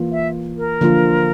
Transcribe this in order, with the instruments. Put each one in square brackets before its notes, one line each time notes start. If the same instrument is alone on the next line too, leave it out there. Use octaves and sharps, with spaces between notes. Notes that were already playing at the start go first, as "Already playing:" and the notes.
Already playing: [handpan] E3 A#3 F4
[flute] E5
A#4
[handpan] D3 F3 A#3 F4